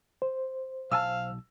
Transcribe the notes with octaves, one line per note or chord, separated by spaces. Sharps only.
C5
B1 F5 G#5 A5 E6